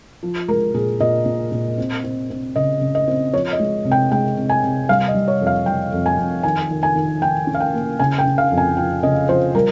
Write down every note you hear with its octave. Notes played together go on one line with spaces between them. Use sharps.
F3
G#3 A#4
A#2 G#4
A#2 D#5
A#2
A#2
C4
C4
C4
C#3 D#5
C#3
D#5
C4
F3 C#5
D#5
G#3
C3
G5
G#3 G5
C3
G#5
C3
G3 F5
D#5
G3
C#5
F2
F5
G3 G5
F2
G#5
F2
D#3 G#5
D#3
G#5
D#3
D#3 G5
C#4
F5
G5
A#3
C#3 G#5
G5
C#3
F5
F2
G#5
F3 G5
C#3 D#5
F3 C5
G3 A#4